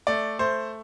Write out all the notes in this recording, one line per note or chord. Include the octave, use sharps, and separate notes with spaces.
A3 D5
A3 C5